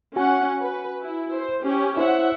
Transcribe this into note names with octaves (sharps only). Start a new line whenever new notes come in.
C#4 F#4 F#5 G#5
B4
E4
C5
C#4 G4
E4 C5 C#5 E5 F#5